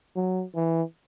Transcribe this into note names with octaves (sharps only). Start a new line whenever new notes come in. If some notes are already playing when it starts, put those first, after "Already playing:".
F#3
E3